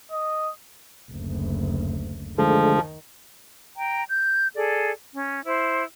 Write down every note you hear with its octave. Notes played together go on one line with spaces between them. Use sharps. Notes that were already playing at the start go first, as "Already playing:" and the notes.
D#5
F#1 D2
D3 D#3 F3 G#3 A3
G5 A#5
G6
G#4 A4 D5
C#4
E4 C5